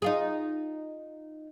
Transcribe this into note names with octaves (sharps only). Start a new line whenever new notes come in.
D#4 F4 G#4